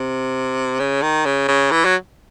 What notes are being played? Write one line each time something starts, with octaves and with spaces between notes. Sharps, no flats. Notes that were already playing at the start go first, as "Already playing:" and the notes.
Already playing: C3
C#3
D#3
C#3
C#3
E3
F#3